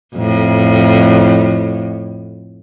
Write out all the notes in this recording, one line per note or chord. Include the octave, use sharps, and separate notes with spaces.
F2 A2